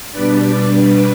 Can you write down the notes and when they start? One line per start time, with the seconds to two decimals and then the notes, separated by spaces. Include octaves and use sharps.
0.11 B2 G3 D4 B4 D5
0.68 B4 D5